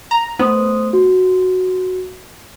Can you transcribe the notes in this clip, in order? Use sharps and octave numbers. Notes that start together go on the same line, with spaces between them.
A#5
A3 B3 C5 D#6
F#4